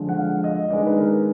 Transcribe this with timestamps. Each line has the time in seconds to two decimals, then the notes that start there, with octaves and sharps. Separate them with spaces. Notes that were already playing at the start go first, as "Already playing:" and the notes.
Already playing: D3 F3 G#3
0.09 F#5
0.17 F5
0.44 D#5
0.70 D#3 G#3 B3 D4 D5
0.87 B4
0.97 A#4